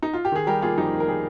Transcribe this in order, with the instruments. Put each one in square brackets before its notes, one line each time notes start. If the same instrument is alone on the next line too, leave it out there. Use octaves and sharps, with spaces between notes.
[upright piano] D#4
F4
G4
D#3 G#4
G3 G4 A#4
A#3 F4 G#4
F2 D#4 G4
D#3
A#4
G3 G#4